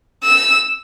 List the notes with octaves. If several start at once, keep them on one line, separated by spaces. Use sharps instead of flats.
E6